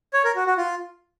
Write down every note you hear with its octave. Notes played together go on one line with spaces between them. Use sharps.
C#5
A#4
F#4
F#4
F4